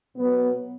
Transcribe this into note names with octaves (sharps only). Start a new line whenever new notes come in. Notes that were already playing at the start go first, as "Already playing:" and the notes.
B2 F#3 B3